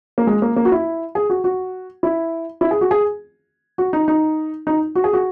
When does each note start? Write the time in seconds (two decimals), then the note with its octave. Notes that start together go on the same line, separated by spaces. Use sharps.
0.18 A#3
0.27 G#3
0.42 A#3
0.56 A#3
0.65 F#4
0.72 E4
1.15 G#4
1.30 F#4
1.44 F#4
2.03 E4
2.61 E4
2.71 G#4
2.81 F#4
2.91 G#4
3.78 F#4
3.93 D#4
4.08 D#4
4.67 D#4
4.95 F#4
5.04 G#4
5.13 F#4